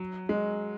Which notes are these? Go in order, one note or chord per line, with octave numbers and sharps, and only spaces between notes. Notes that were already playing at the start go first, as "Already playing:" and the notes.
Already playing: F#3
G#3